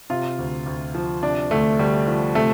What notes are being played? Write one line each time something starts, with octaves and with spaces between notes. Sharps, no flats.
C3 F4
D2
D2
F3
C3 D4
D2 A3
D2 G3
F3
C3 A3